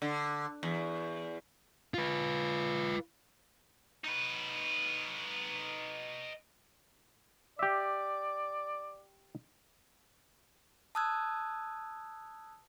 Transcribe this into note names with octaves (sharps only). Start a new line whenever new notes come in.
D3
E2
F4 B4
D#4 B4
G4 D5 E5
A5 D#6 E6 F#6 G#6